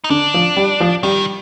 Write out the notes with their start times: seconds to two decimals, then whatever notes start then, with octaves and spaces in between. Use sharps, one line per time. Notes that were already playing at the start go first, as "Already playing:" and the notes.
0.04 D#4
0.10 D3 D4
0.34 F3
0.57 G3
0.80 F3
1.03 D#3 G3